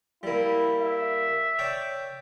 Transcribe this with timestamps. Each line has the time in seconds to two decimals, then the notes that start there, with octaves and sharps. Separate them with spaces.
0.23 G3 A#3 E4
0.81 E5
1.59 C#5 D5 G5